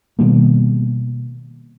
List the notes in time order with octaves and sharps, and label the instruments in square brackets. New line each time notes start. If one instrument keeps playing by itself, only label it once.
[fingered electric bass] B2 D#3 G3 A#3